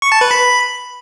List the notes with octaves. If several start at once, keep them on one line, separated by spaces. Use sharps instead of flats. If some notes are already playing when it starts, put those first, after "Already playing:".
C#6
A5
B4
B5